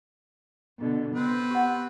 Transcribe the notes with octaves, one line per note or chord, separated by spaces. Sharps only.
B2 D3
B3 C4 B4
G4 F#5